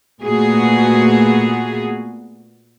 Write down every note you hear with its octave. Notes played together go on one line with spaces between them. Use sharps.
A#2 A3 B3 F#4 G#4